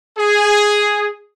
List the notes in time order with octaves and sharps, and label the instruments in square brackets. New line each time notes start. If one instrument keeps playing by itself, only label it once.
[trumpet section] G#4